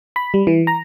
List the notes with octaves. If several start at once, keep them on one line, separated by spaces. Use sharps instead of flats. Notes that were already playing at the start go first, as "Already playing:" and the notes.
B5
G3
E3
A#5